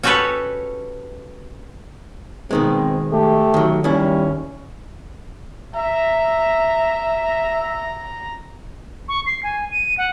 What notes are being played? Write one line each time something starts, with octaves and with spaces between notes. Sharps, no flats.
C#4 F#4 G4 A4 B4 C#5
B2 D#3 G#3 C4
A3 G4
D#3 F#3
D#2 G3 C#4 E4
E5 A#5
C#6
C7
G#5
D#7
F#5